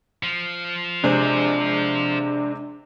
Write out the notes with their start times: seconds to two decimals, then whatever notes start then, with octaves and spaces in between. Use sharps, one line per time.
0.23 F3
1.04 C3 G#3 D4 G#4 C5